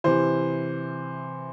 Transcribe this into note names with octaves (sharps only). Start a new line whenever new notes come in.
C3 E3 C5